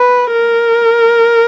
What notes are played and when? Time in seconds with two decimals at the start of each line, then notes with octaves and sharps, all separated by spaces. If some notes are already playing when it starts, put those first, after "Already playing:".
Already playing: B4
0.32 A#4